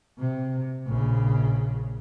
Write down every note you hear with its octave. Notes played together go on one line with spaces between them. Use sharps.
C3
A#1 C#3